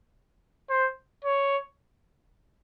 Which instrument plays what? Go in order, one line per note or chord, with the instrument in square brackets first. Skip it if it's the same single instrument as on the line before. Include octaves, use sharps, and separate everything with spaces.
[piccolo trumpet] C5
C#5